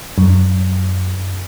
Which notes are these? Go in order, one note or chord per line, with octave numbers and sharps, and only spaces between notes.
F#2